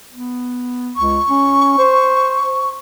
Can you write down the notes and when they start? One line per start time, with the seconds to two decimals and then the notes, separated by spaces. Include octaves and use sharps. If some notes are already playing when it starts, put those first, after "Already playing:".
0.11 B3
0.96 C#2 C#6
1.29 C#4
1.78 C5